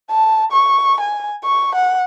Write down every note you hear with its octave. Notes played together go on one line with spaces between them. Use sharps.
A5
C#6
G#5
C#6
F#5